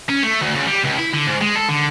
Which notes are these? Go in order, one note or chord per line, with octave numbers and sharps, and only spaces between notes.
C#4
A3
D2
C#2
G3
C#2
E4
D3
G#2
G#3
A4
D3